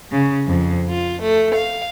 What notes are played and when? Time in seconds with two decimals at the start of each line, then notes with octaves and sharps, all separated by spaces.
0.13 C#3
0.47 F2
0.88 F4
1.22 A3
1.55 F5